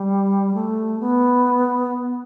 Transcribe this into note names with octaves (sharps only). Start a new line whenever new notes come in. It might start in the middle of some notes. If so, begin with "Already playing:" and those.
Already playing: G3
A3
B3